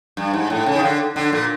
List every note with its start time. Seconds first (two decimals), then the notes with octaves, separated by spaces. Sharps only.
0.17 G2
0.33 G#2
0.50 A2
0.66 C#3
0.76 D#3
0.83 D3
1.16 D3
1.32 A#2